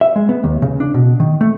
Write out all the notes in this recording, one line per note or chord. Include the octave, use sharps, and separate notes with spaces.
E5
G#3
B3
D#2
C#3
D4
B2
D#3
A3